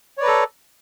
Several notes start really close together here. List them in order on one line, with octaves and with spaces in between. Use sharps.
C#5 D5 B4 A#5 A4